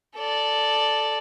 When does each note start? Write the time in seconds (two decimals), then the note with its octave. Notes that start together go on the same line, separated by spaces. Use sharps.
0.16 A4 D5